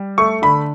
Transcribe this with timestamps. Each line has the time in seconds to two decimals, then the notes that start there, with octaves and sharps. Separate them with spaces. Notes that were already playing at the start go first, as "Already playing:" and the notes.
Already playing: G3
0.18 A3 C#6
0.42 D3 B5